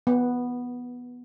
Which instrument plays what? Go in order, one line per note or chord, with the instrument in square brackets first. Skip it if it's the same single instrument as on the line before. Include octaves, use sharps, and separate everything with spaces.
[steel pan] B3